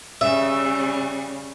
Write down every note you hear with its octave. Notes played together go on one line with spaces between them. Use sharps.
C#3 G3 E5